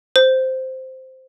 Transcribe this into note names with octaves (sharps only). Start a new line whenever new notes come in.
C5